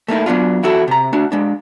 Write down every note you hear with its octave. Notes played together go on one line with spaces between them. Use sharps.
A3 A#3 D#4 E4
F#3 B3 D4 F4
E2 E4 F#4 A4
C3 A#5
A3 D4 F#4
G#3 D4